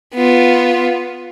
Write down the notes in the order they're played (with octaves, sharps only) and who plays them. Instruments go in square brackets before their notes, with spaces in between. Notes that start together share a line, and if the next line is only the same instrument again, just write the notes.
[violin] B3 F4